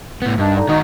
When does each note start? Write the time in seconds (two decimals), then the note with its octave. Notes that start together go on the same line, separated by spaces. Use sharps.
0.22 A2 B3
0.38 G2 D#3 D4
0.56 D3 D#4
0.69 D#3 D#4 F#4